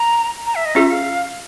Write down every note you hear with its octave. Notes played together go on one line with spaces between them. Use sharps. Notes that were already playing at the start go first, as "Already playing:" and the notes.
Already playing: A#5
A#5
E5
D#5
C#4 F4 G#4 E5
F5